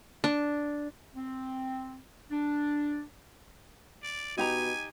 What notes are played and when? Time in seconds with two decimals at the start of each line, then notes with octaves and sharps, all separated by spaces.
0.24 D4
1.16 C4
2.31 D4
4.03 D5
4.38 B2 D#4 G4 G#5 A#5